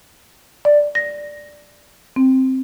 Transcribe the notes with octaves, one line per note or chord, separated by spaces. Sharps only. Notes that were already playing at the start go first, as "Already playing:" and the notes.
D5
A#6
C4